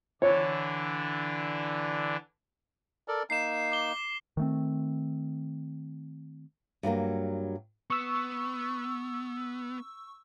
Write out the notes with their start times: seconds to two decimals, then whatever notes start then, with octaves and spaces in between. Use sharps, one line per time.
0.22 D3 E3 D4 C#5
3.08 A4 A#4 D5
3.30 A#3 D#4 C7 E7
3.72 D6 G7
4.37 D#3 A3 C4
6.83 G2 F#3 G3 A#3
7.90 B3 C#6 E6